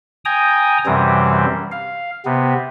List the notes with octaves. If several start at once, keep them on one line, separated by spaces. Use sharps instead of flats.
G5 G#5 A#5 D#6
F#2 C3 E3 G3 C4
F5
C3 B3